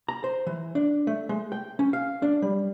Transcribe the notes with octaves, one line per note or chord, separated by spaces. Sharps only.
A#5
C5
E3
D4
A3
G#3
G5
C#4
F5
D4
G3